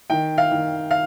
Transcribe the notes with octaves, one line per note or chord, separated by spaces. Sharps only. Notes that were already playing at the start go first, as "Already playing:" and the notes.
D#3 G5
F5
D#3
F5